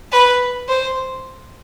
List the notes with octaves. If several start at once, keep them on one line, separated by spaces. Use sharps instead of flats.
B4
C5